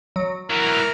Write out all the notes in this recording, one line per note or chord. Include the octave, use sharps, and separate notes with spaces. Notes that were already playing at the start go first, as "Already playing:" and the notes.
F#3
E3 F#4 A#4